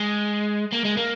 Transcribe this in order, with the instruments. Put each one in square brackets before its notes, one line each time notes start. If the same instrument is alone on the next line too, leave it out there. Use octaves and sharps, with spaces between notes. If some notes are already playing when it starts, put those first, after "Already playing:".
Already playing: [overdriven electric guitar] G#3
A#3
G#3
A#3